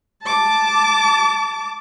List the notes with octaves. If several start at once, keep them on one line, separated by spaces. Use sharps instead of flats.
A5 D6